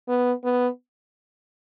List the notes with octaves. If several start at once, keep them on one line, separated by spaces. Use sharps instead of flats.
B3
B3